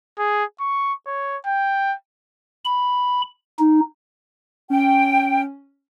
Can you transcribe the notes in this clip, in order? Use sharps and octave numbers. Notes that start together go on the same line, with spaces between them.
G#4
C#6
C#5
G5
B5
D#4
C#4 G5